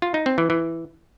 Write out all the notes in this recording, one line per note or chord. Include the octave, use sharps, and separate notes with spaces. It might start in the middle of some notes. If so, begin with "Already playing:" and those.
F4
D#4
C4
E3
E3